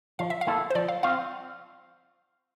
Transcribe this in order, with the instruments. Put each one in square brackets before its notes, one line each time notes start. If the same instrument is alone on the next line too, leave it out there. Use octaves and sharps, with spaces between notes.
[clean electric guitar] F3 [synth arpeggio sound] F5
[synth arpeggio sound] E5
F5
[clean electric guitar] A#3 E4 A4
[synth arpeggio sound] C5
[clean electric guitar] F3 [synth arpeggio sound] D5
[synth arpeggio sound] F5
[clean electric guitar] C4 F4 [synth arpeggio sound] F5